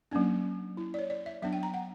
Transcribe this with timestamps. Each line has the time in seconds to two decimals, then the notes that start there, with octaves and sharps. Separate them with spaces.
0.11 F#3 A#3 C#4 D4
0.77 E4
0.94 D5
0.99 C#5
1.10 D5
1.26 E5
1.42 F#3 B3 D4 E5
1.53 G5
1.63 A#5
1.74 F#5